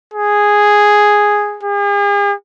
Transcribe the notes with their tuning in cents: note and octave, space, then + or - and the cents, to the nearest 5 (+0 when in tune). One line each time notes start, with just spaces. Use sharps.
G#4 -5
G#4 -45